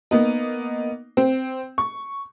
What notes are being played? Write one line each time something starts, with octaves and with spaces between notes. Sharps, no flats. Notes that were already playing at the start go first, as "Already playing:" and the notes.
A#3 B3 D#4
C4
C#6